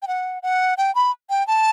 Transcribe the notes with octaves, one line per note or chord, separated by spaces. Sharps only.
G5
F#5
F#5
G5
B5
G5
A5